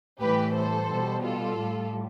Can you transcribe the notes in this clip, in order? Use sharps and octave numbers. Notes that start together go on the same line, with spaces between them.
A2 E3 G3 G4 B4
A4 C5
B2 G3
F4 A4
A2 G3